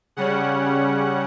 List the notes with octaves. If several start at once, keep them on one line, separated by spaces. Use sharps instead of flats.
C#3 G3 C#4 F#5